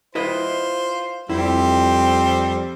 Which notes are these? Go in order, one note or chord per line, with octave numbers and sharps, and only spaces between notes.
E4 F4 B4 C5 D#5
F2 G3 C4 E4 C5